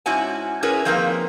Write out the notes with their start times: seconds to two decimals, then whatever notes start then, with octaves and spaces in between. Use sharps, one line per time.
0.06 G#2 C#4 E4 F#4 G#5
0.63 C#4 E4 G#4 A#4 B4 C#5
0.85 F3 A#3 C4 D#4 A#4 B4